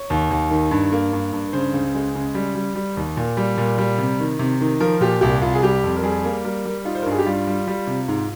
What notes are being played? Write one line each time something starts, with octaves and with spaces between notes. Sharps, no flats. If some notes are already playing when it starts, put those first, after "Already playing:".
Already playing: C#5
D#2
D#2
D#3
G2
A#3
G2
G2
C#3 C5
C#2
G#3
C#3
G3
G3
G3
D#2
A#2
G3
A#2
G3
C3
D#3
C3
D#3
F3 A#4
A#2 G4
C2 G4
C2 F4
G#4
G3 G4
F2
A#4
G3 G#4
A#3
G3 A#4
G3
D#4 F4
C5
A#4
G2 G#4
G4
G3 F4
G3
G3
C3
G#2